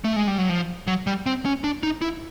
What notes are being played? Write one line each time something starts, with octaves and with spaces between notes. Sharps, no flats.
A3
G#3
G3
F#3
F3
F#3
G3
C4
C#4
D4
D#4
E4